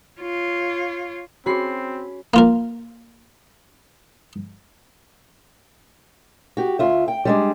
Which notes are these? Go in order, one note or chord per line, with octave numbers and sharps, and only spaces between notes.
F4 C#5
C4 C#4 F#4 G#4 B5 C7
A#3 F4 A#4
F#4 G4
D2 F4 E5
G5
G3 G#3 D4